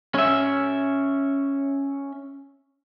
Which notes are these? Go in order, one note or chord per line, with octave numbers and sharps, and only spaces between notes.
C#4 E5